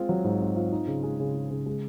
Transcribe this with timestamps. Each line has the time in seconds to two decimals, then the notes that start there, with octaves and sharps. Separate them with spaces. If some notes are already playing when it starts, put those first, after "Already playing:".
Already playing: G#3 C4 F4
0.09 F#3
0.24 G#2
0.41 C4
0.56 F4
0.72 D#4
0.87 C#3
1.04 G#3
1.20 C#3
1.34 D#4
1.51 C#3
1.66 G#3